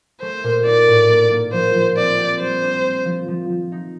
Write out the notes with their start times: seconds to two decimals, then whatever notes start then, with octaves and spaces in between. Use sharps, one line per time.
0.21 A3 C5
0.44 A#2
0.66 D#4 D5
0.87 A2
1.09 A#3
1.31 A#3
1.53 F3 C5
1.74 F3
1.97 C4 D5
2.18 G4
2.41 G3 C5
2.62 D4
2.84 C4
3.05 F3
3.28 F3
3.49 F3
3.72 D#4